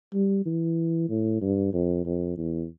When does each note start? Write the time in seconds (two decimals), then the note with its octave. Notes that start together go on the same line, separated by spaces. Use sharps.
0.14 G3
0.46 E3
1.10 A2
1.41 G2
1.73 F2
2.05 F2
2.38 E2